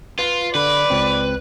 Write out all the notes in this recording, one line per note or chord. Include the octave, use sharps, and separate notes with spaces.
F4 B4
D3 B4 D5
C#2 C4